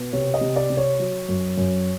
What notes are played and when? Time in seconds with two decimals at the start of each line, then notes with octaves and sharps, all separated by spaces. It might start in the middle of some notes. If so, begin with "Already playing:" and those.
Already playing: B2 B3
0.13 C3 C#5
0.34 D#5
0.41 C3
0.56 D5
0.70 C3
0.77 C#5
1.00 F#3
1.28 F#2
1.57 F#2